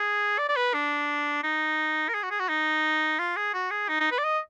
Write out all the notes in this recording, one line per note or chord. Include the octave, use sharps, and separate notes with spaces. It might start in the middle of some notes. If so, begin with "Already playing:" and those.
Already playing: G#4
D5
D5
B4
D4
D#4
A#4
G#4
F#4
G#4
F#4
D#4
F4
G#4
F#4
G#4
D#4
D#4
B4
D5
D#5